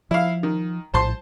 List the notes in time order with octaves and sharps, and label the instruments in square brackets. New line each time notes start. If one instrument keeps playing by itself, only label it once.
[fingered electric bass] F3 [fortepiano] E4 F5
[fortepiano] D#3
[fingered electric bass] A#1 A2 [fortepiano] C5 A5 C6